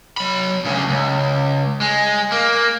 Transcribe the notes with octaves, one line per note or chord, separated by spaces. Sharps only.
F#3 B5
D2 C#3
C#2
G#3
A#3